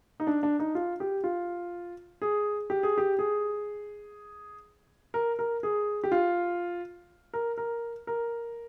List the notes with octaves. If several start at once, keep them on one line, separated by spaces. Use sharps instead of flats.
D#4
D4
D4
D#4
F4
G4
F4
G#4
G4
G#4
G4
G#4
A#4
A#4
G#4
G4
F4
A#4
A#4
A#4